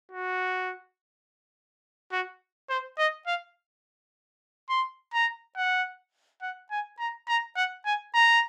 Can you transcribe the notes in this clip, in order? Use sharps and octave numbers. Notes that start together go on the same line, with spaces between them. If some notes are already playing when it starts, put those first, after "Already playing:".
F#4
F#4
C5
D#5
F5
C6
A#5
F#5
F#5
G#5
A#5
A#5
F#5
G#5
A#5